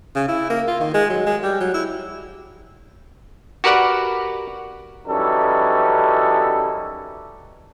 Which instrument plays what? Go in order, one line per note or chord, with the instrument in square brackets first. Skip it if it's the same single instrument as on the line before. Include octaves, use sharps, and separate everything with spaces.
[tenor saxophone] C#3
E4
A#3
F4
D#3
G#3
F#3
G#3
G3
F#3
E4
[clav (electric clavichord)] F#4 G4 A#4 B4 D5 F#5
[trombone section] F#2 E3 G3 C#4 D#4 A4